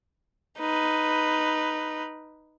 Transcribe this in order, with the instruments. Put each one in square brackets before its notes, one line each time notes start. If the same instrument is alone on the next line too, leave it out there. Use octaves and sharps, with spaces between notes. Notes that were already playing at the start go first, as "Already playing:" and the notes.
[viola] D#4 B4